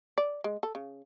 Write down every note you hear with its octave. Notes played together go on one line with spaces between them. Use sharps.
D5
G#3
A4
C#3